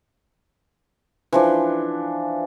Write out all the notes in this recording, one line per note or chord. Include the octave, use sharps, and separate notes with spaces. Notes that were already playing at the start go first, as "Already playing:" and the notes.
E3 F3 D4